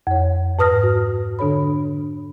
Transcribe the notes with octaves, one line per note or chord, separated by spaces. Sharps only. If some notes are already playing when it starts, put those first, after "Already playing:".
F2 C#5
G#2 B4 D#6 F6 A#6
F#4
D3 D4 A4 C#5 B5